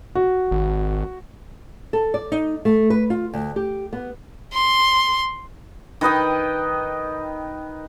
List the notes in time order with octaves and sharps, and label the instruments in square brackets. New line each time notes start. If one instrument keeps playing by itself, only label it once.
[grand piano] F#4
[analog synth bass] G#1
[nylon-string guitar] A4
D5
D#4
A3
B4
F4
D2
G4
B3
[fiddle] C6
[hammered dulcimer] D#3 B4 D#5 G5